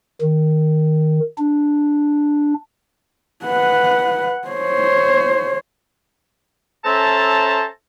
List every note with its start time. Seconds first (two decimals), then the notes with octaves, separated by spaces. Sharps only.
0.21 D#3
1.38 D4
3.46 B4 F#5
4.48 C5 C#5
6.84 C#4 A4 C5 E5 A5 A#5